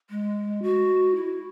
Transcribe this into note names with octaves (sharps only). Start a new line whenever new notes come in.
G#3
F#4
E4